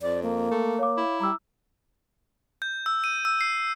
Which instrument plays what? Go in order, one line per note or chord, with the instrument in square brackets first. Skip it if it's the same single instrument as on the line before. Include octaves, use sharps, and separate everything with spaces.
[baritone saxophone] F2 [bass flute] D5
[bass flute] A#3
[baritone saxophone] A3
[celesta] C#5 F5 D6
[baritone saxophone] E4
[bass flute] G3 [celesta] A#5 D6 E6
[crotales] G6
E6
D#7
E6
C7